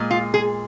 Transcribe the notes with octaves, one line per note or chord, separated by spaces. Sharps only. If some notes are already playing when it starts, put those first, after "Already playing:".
Already playing: A#2 G#3
F4
G#4